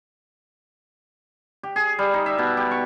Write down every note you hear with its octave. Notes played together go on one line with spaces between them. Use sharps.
G4
G#4
G3
D#4
E5
B2
G4
C#6